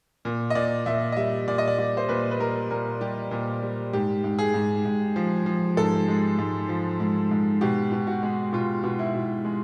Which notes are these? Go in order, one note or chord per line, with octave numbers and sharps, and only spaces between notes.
A#2
D#5
A#2 D5
A#2 E5
D#5
G3 E5
A#2 D5
D#5
D5
G3 D5
C5
A#2 B4
B4
G3 A#4
A#2 A#4
G3 G4
A#2
G3
G#2 G4
G#2
G#4
G#2
G#2
F3
F3
G#2 A4
G#3
G#2
F3
G#2
G#2
B2 G4
B2
F#4
G#3
B2 F4
B2
E4
B2
G#3